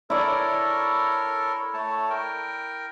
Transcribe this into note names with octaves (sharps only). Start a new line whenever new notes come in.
E4 A4 A#4 C#5 D5
A3 C#5 A5
A#4 G5